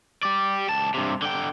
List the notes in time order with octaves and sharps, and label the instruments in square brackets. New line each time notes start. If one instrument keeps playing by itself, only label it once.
[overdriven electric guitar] G4 D5
C#2 A5
G2 C3
D3 G5